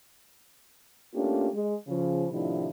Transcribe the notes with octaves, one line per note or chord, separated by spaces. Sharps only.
A3 A#3 C#4 D4 F4 G4
G#3
C#3 F3
A2 C3 D#3 F3 D4 E4